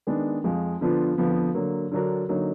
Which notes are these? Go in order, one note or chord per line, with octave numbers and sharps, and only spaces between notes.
D#3 G#3 B3 D4
F2 F3 G#3
D3 F3 B3 D4 F4
F2 D3 F3 B3
D3 F#3 A#3
D3 F#3 D4 F#4 A#4
D3 F#3 A#3 D#4